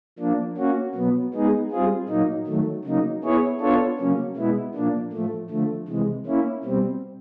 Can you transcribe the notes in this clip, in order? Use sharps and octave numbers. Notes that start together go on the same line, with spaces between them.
F3 A#3 D4
A#3 C#4 F#4
B2 F#3 B3
G#3 B3 D#4 G#4
G3 C4 F4 G#4
A#2 F#3 A#3 D#4
D#3 F#3 A3
C#3 F#3 A#3 D#4
B3 E4 G#4 C#5
B3 D4 F4 A4 C#5
C#3 F#3 A#3 C#4
B2 G#3 B3 E4
A#2 F3 A#3 D4
A2 F3 A3
D3 F3 A3
C3 E3 G#3
A#3 C#4 E4
B2 G3 C4